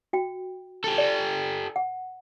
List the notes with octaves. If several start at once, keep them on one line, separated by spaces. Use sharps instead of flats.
F#4 G5
G4 A4
D5
F#5